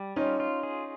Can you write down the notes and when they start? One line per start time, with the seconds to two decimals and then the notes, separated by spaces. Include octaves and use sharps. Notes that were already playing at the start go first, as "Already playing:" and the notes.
Already playing: G3
0.16 C#4 D#4 F4
0.40 F4
0.63 G#4